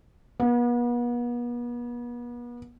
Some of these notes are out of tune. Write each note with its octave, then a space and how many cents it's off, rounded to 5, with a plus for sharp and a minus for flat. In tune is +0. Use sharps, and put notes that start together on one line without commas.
B3 -40